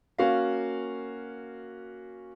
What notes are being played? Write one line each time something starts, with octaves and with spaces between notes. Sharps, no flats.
A#3 C#4 F#4 F5